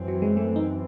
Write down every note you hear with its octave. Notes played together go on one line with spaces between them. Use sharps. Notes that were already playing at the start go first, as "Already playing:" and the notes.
Already playing: F#2 E3 C4
F#3
G#3
A3
D#4